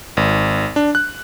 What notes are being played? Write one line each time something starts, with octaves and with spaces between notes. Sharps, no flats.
G#1
D4
F#6